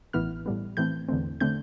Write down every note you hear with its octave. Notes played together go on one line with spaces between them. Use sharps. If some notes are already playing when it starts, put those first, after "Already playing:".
A1 A2 E3 B3 F6
A2 G3 B3
A2 E3 A3 C4 G6
E2 D3 A3 C4
D3 A3 C4 G6